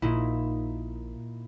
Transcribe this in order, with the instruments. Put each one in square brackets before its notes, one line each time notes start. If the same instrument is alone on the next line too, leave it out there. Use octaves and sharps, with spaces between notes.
[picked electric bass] A#1 [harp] A#2 D#4 E4